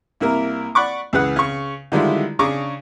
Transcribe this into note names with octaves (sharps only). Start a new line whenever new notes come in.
C2 A#3 E4 A#4
D5 F#5 B5 C#6 D6
C#2 E3 G#4 B4 F#5
C#3 C#6
D3 D#3 G3 G#3 E4 F4
C#3 D4 G#4 A#5 C#6 D6